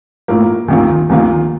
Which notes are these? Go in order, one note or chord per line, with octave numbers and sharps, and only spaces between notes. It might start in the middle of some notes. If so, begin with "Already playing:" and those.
A2 F3 A#3
D2 C3 D#3 A#3 F4
D2 C3 D#3 A#3 F4